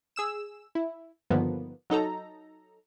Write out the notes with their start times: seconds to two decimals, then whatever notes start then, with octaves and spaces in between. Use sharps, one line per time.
0.16 G#4 E6 E7
0.75 E4
1.30 G2 D3 D#3 F3 A#3 B3
1.90 F#3 D#4 A4 A#5